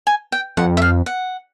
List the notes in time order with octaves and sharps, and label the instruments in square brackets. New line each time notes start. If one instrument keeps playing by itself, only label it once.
[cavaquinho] G#5
G5
[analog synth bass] F2 [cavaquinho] F#5
[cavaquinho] E5
F5
F#5